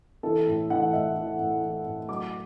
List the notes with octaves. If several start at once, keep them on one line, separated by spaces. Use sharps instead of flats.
E3 A4
A2
E3 F#5
A2 E5
E3
A2
E3
A2
F#3 D6